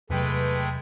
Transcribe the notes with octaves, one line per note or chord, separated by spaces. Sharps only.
E2 C3 F#3 G#3 A3 B4 G5